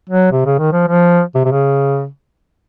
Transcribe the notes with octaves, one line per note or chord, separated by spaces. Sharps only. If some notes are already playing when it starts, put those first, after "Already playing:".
F#3
C3
C#3
D#3
F3
F3
C3
C3
C#3